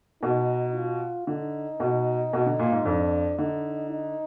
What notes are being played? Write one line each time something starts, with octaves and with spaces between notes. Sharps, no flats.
B2 D#4
F4
D3 D#4
B2
B2
D3
A#2
G#2
F2 D4
D3 D#4
D#4